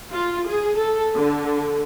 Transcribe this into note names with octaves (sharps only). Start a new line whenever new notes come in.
F4
G#4
A4
D3